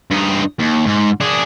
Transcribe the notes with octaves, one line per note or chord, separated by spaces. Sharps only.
G2 D#4
D#2
G#2
D4 G#4